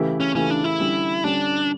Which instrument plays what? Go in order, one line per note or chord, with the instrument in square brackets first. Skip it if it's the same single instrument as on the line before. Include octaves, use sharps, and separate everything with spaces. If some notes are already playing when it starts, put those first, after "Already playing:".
Already playing: [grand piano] C#3 E3 A3 E4 G4
[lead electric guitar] C#4
[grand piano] C#3 E3 A3 E4 G4 [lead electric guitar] C#4
[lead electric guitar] D4
E4
[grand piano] D3 G3 C#4 G4
[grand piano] D3 G3 C#4 G4 [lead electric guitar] D4